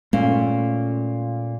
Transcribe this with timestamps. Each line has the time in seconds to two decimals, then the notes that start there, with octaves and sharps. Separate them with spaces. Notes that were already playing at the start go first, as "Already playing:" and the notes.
0.13 A#2 G#3 A3 C#4